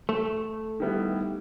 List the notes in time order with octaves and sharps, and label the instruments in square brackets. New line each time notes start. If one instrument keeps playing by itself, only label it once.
[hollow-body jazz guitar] A3
[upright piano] D#3 G3 B3 E4